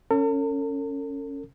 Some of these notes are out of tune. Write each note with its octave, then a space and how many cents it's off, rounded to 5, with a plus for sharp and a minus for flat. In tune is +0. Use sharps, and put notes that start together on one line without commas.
C#4 +0 A4 +45